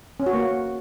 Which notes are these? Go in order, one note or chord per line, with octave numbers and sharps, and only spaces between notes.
C#4
F#4
A#3